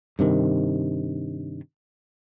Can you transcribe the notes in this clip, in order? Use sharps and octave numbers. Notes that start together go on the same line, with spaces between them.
G2 C3 D#3